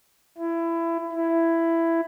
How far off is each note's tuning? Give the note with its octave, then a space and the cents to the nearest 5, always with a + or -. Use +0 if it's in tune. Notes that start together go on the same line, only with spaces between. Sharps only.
E4 +20
E4 +10